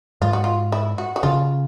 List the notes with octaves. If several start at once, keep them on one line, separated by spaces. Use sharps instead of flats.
G#2 G#3 F4
F#4
F4
E4
F#4
F#4
C#3 C#4 F4